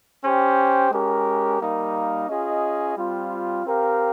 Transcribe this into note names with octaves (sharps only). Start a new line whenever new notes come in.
C#4 G4 C5 G5
G#3 C#4 G4 A#4
G3 A#3 D#4 A#4 F5
C#4 F4 G#4 D#5
G3 C4 F4
C4 G4 A#4 F5